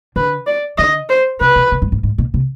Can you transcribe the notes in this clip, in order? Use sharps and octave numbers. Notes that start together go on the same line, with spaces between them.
D3 B4
D5
D3 D#5
C5
C3 B4
B2
B2
G#2
G#2
G#2
B2
C3